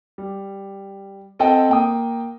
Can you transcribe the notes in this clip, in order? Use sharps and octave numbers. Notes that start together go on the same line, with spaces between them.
G3
C4 A4 D#5 F#5 G5 A5
A#3 G5 D#6